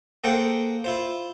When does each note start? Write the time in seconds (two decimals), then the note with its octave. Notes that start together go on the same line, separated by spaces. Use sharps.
0.24 A#3 G#4 A4 C5 F#5 G5
0.84 E4 F4 C5